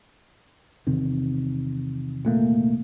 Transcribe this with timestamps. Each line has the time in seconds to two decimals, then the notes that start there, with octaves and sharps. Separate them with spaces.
0.87 E2 C3 D#3
2.25 A#2 A3 A#3